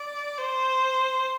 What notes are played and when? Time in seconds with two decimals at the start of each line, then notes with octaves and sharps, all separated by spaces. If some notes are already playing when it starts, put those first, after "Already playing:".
Already playing: D5
0.38 C5